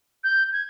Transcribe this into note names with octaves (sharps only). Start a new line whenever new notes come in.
G6
G#6